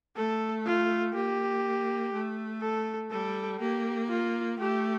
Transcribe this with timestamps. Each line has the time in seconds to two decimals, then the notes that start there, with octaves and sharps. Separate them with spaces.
0.16 A3 A4
0.65 F4
1.14 A#3 G4
2.13 A3
2.61 A4
3.10 G3 A4
3.60 A#3 G4
4.09 F4
4.58 A3 G4